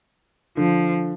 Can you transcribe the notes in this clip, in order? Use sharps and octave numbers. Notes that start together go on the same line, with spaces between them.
D3 F3